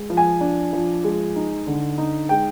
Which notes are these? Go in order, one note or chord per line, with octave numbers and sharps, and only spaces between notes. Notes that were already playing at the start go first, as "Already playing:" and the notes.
Already playing: G#3
F3
G#5
D4
F3
G#3
D#4
D3
D#4
G#3 G5